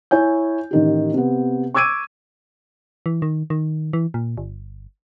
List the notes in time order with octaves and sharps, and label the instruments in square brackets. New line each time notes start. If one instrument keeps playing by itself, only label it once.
[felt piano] E4 C#5 G#5 G6
A1 D#3 G4
C3 B3
C#6 D6 E6 G#6 D7 D#7
[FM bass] E3
D#3
D#3
E3
A#2
G1